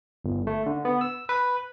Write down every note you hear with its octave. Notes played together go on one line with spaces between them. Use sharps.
G1
A3
D3
B3
E6
B4